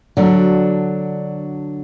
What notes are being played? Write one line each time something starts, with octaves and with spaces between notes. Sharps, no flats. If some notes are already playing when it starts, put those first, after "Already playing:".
D3 F#3 D4 F#4